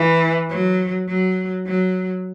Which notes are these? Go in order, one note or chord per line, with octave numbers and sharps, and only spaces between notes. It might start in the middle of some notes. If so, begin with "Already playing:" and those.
Already playing: E3
F#3
F#3
F#3